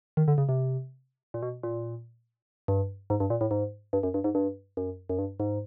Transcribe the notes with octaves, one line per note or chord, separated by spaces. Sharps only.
D#3
D3
C#3
C3
A#2
B2
A#2
G2
G#2
G2
A#2
A2
G#2
G2
F#2
G2
G#2
G2
F#2
F#2
G2
G#2